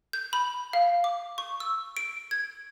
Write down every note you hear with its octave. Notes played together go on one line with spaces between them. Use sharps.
G6
B5
F5
D6
C#6
E6
D7
G#6